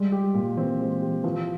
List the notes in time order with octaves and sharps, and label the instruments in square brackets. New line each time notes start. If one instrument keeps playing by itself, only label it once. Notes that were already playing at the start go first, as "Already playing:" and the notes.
Already playing: [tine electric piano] G3 [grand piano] G#3
[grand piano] G4
A#2
[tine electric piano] E3 [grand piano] C4
[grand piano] G#3
G4
[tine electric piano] E3 [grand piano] F3